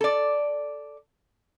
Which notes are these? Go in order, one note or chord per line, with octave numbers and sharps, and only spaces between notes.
A4 D5